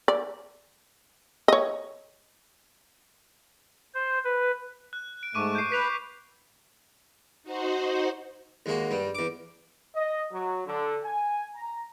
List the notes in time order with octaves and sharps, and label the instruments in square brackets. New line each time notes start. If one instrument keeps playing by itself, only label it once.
[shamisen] D5
C#5 D#5
[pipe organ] C5
B4
[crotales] F#6
D7
[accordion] G#2 A3 [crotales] C#6 D6 D#7
[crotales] G6 C7
[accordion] B4 [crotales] B6 F7
[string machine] D#4 F#4 C5 F#5
[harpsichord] D#2 G#3 A#3 F#4
G2 G3
E2 D6
[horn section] D#5
F#3
D3
G#5
A#5